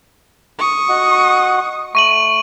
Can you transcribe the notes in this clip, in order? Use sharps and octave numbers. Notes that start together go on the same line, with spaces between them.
C#6 D#6
F#4 D#5 F#5
A3 C#6 D#7 F#7